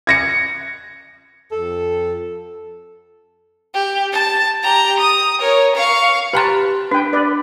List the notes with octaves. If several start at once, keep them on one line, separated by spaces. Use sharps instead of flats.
G#6 A#6 C#7
F2 A4
G4
A5
G4 A#5
D#6
A#4 C#5
F5 C#6
G4 B4 G5 A5 A#5 C6
D4 B4 G5
B4 D5